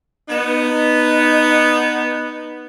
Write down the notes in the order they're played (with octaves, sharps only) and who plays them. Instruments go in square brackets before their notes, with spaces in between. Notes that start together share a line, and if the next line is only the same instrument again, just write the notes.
[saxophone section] B3 D#4